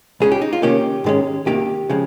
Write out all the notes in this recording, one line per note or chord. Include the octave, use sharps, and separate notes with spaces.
C#2 C#3 G#3 C#4 G#4
G4
D#4
F4
C3 D#3 A#3 C#4 G4
G#2 D#3 G#3 C#4
C2 C3 D#3 A#3 G4
C#3 F3 G#3